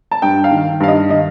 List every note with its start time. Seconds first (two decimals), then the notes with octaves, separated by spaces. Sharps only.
0.11 A5
0.22 G2 G5
0.44 F5
0.51 D#3
0.80 G2 F5
0.88 D#5
1.10 D#3 D#5